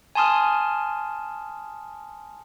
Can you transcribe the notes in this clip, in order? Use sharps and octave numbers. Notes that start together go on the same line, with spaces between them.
G#5 A5 C6 D#6 F6